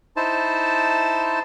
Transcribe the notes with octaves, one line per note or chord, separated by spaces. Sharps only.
D#4 E4 C5 A5